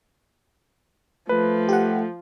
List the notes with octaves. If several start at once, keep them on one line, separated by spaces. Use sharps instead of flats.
F3 A3 B4
G4 F#5